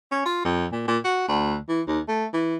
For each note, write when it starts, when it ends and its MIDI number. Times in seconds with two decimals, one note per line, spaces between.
0.12 0.25 61
0.25 0.42 65
0.45 0.66 41
0.72 0.86 46
0.87 0.98 46
1.04 1.23 66
1.28 1.57 38
1.69 1.81 52
1.88 2.00 39
2.08 2.26 57
2.33 2.56 52